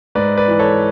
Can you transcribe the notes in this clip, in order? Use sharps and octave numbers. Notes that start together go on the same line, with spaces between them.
G#2 B4 D5
B4 D5
E3
A4 C#5